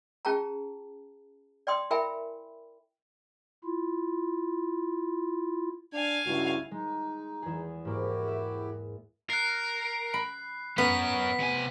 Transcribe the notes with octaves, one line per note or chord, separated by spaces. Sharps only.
C#4 F4 G#4 G5 A5 A#5
D5 G5 C6 D#6
E4 A#4 E5 G5 G#5 B5
E4 F4
D4 F5 G#5
C#2 G2 E4 F#4
G#3 D#4
E2 G#4
G#2 A#3 E4 F#4 G4
E5
A#4 F#6 C7
B5
B3 C#4 A#4 B6
C3 G#5